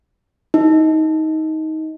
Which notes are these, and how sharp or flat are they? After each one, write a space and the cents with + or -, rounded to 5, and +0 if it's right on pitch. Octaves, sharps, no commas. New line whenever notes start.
D#4 +20